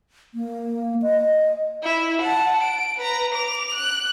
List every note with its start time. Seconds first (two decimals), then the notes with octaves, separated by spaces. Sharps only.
0.34 A#3
1.02 D#5
1.83 E4
2.21 F#5 A5
2.63 D7
2.97 B4 A#5
3.34 D6 F7
3.74 F#6